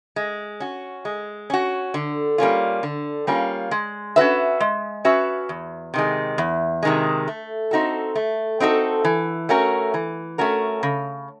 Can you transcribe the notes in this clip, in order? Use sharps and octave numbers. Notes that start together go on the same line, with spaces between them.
G#3
C#4 F#4
G#3
C#4 F#4
D3
G3 A#3 C#4 F4
D3
G3 A#3 C#4 F4
G#3
C#4 F#4 B4 E5
G#3
C#4 F#4 B4 E5
E2
C3 D#3 G#3
E2
C3 D#3 G#3
A3
C4 D#4 F#4 A4
A3
C4 D#4 F#4 A4
E3
A3 C#4 F#4 A#4
E3
A3 C#4 F#4 A#4
C#3